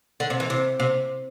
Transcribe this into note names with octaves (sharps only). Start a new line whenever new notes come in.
D3
C3
E3
C3
C3